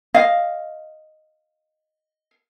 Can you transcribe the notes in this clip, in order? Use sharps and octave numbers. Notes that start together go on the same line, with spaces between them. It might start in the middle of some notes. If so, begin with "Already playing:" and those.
D#5 F5